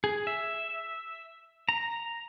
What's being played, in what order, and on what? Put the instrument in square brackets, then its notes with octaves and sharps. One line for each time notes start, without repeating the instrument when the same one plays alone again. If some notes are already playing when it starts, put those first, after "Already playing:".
[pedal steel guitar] G#4
E5
A#5